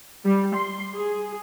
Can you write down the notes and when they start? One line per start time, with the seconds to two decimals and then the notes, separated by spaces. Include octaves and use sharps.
0.25 G3
0.55 C6
0.94 G#4